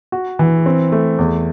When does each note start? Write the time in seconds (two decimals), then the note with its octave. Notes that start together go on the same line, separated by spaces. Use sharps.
0.12 F#4
0.39 E3
0.66 C4
0.92 A3
1.18 E2